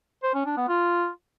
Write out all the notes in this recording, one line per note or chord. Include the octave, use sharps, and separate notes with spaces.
C5
C#4
D4
B3
F4